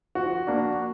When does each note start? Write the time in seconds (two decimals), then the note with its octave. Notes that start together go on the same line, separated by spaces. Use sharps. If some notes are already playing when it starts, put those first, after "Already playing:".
0.15 F3 F#4
0.47 A#3 D4